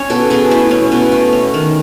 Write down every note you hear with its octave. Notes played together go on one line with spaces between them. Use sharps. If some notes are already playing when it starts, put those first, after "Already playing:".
Already playing: C#4 C#5
B2 A4
B2 G#4
A3 E4
C#4
B2
A3
C#4
D#3